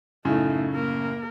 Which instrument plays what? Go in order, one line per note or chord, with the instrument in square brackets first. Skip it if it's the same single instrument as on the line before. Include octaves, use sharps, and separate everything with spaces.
[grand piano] F#2 A2 C#3 [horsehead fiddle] A3 D#4
[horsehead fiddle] A#3 A#4